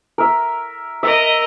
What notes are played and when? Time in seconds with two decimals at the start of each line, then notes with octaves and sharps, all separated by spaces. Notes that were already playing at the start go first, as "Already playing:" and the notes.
0.18 A#4 E5
1.03 A#4 D#5 E5